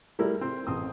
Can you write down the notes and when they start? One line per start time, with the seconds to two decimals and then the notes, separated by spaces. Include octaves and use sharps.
0.19 G3 A3 E4 A4 A#4
0.41 C4
0.67 A1 C4 D#6